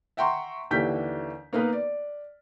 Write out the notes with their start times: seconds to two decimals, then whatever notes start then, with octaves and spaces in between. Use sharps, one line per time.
0.17 E5 F#5 G5 A#5 C6 C#6
0.70 D#2 D3 E3 G4 G6 B6
1.53 A#3 B3 D#4 A#4 B4
1.73 D5